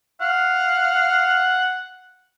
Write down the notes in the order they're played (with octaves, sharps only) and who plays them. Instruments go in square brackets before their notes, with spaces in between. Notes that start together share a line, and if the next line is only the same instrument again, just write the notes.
[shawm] F5 [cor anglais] F#5